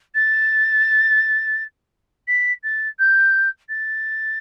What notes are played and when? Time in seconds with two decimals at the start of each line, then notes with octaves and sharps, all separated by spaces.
0.15 A6
2.28 B6
2.63 A6
2.99 G6
3.69 A6